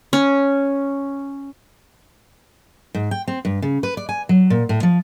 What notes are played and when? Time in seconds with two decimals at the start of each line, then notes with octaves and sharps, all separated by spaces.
0.13 C#4
2.95 G#2
3.11 G5
3.28 C4
3.45 G2
3.62 C#3
3.83 B4
3.97 D5
4.09 G#5
4.29 F#3
4.50 A#2
4.69 A2
4.83 F3